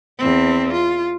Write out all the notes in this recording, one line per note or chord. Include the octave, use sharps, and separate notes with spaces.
E2 C4
F4